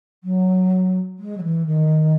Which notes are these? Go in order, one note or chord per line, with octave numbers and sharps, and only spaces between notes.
F#3
G#3
F#3
E3
D#3